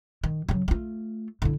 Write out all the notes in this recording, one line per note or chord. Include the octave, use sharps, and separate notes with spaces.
D#3
C#3 F#3
A3 F4
D3 E4